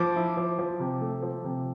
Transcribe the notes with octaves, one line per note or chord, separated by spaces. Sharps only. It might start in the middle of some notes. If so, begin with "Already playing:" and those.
Already playing: F3 D6
E4
F3
F3
C3
A3
F3
C3